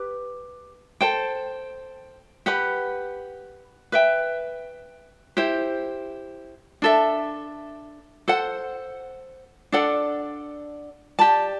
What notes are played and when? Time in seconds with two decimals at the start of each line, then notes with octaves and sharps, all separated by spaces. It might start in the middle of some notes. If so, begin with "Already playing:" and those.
Already playing: G4 B4
1.01 A4 C5 G5
2.46 G4 B4 F#5 B5
3.92 B4 E5 G5
5.37 E4 G4 C5
6.82 D4 A4 E5
8.28 A4 C5 F#5
9.72 D4 A4 D5 F#5
11.19 G4 D5 A5